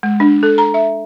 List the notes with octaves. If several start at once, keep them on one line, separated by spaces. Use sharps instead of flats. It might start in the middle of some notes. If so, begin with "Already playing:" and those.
G#3
D4
A4
A#5
E5